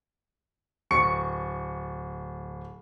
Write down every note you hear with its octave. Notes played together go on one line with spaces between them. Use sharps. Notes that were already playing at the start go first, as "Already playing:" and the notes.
D1 C#6 C#7